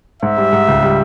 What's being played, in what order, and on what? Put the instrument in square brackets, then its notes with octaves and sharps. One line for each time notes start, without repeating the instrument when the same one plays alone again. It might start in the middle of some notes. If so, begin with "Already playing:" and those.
[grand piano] G#2 [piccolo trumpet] E5
[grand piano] G3
G#2
C#2
G3